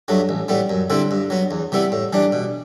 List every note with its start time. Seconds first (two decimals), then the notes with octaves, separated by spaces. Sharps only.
0.08 G2 F#3 A3
0.29 A1
0.48 A2 G3 B3
0.69 F#2
0.90 D3 G3 C4 E4
1.11 G2
1.30 F#3 B3
1.51 E2
1.72 C3 G3 B3 E4
1.92 A2
2.13 E3 G3 D4
2.32 B2